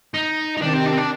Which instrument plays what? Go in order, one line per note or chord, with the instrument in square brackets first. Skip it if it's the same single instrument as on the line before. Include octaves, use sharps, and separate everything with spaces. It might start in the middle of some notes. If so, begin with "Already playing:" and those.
[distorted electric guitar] D#4
D#4
[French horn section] C3 D#3 [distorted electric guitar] D4
[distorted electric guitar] C4
D4
C4
D4